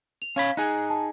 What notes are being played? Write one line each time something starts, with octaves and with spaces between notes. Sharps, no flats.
F7
C#4 C#5 F5 B5
D#4 G#4 F#6
A5